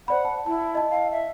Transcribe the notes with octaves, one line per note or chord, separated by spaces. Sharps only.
C5 D5 F#5 B5
A5
E4 A5
D#5 A5
F5
E5